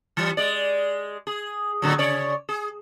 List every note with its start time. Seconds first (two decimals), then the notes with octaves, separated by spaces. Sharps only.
0.17 E3 G3
0.37 G#3 D5
1.27 G#4
1.82 A2 D3 F#3
1.98 C#3 C#5 D5
2.49 G#4